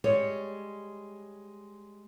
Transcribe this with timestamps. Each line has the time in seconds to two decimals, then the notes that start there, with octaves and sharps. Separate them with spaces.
0.04 G3 G#3 C#5